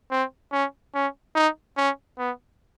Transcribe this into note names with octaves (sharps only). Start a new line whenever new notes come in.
C4
C#4
C#4
D#4
C#4
B3